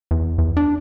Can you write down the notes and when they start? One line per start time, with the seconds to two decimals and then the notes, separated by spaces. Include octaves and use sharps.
0.11 E2
0.38 E2
0.57 D4